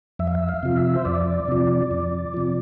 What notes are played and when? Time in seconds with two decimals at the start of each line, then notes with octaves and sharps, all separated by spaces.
0.19 F2 E5
0.27 F5
0.35 E5
0.49 F5
0.63 C3 F3
0.77 E5
0.95 C5
1.05 F2 D5
1.48 C3 F3
1.91 F2
2.34 C3 F3